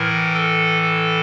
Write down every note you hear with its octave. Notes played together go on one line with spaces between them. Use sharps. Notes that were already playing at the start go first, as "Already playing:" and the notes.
Already playing: A2 E3 A#4
A4
A4